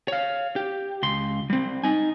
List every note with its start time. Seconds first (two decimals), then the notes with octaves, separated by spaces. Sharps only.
0.08 C#5 F5
0.56 G4
1.03 C#2 C6
1.50 G3 C4
1.84 D#4 G#5